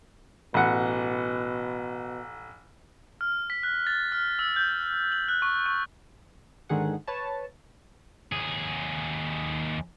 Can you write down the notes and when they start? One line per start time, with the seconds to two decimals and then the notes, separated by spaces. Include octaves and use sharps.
0.54 A1 B2 F#5
3.21 F6
3.50 B6
3.63 F#6
3.87 A6
4.12 F6
4.39 E6
4.56 G6
5.12 F#7
5.28 F#6
5.42 C#6
5.66 C#6
6.69 G#2 D3 D#3 G#4 F#5
7.08 B4 C#5 A5
8.32 D#2 G#4